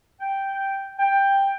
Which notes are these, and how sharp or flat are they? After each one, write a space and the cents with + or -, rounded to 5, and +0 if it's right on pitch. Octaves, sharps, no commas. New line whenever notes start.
G5 -5
G5 +10